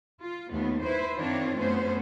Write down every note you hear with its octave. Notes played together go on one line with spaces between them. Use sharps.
F4
D#2 A3 B3
E4 B4 C5
F#2 D#3 C4 D4 F4 C#5
F#2 A3 B3 C#4 C5